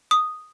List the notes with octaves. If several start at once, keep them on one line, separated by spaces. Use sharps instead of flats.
D#6